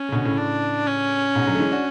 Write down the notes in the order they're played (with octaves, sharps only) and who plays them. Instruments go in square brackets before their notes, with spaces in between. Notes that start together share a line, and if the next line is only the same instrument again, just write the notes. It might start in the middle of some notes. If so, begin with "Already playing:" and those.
Already playing: [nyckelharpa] C#4
[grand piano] C#3
B2 D3
A2 C#3
[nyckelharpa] D4
C#4
[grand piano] G#2 B2
D3 F#3
A3
E3 G#3
D4 F#4